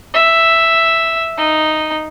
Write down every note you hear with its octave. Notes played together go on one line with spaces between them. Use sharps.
E5
D#4